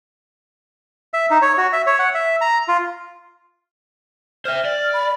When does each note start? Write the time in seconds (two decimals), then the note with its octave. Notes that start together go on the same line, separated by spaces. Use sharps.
1.14 E5
1.30 D#4
1.42 C#5
1.58 F#4
1.73 E5
1.87 C#5
1.99 F#5
2.14 E5
2.41 A#5
2.68 F4
4.45 C5 E5 F6
4.65 D5
4.93 B5